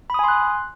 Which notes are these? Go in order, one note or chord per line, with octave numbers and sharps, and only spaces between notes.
G#5 B5 C6 D#6 F#6